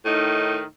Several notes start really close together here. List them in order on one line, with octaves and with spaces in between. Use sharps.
A2 D#4 D#3